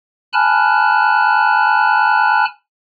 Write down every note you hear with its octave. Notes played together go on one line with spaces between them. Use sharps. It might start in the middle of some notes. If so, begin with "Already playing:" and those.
G#5 A5 B5 F6 F#6